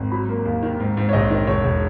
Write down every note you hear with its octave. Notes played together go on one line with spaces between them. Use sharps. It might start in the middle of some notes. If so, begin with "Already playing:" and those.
Already playing: G#1
F#3 B5
A#3
D#2
D#3
G#2
G#2
C#5
A#1 D#5
D#3
E1 C#5
E1